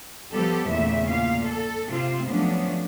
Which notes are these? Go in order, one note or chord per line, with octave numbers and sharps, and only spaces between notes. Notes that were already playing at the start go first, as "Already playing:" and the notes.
F3 G3 B3 G4 A4
E2 A#2 C#3 A3 E5
A#2 F5
A4
C3 C4 F4
F3 F#3 A3 B3 C#4 D4